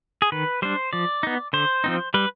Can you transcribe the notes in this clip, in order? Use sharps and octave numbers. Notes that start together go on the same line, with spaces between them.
G#4
D#3 B4
G3 D4 C5
F3 D5
B3 D#4
D3 C5
F3 C4 D#4
G3 B4